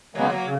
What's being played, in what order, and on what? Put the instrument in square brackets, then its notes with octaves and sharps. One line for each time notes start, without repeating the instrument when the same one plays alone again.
[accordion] C#3 G#3 B3 [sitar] F#3 A#3
[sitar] F#3 A#3
[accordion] C#3